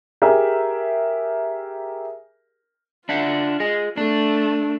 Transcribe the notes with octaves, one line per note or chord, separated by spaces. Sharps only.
G4 G#4 A#4 E5
D4 F4 E5 F#5
G#4 D#5
A3 D4